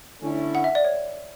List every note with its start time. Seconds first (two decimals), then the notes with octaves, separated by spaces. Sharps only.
0.21 D3 A3 C#4 E4
0.55 F#5
0.64 E5
0.75 D5
0.85 C#5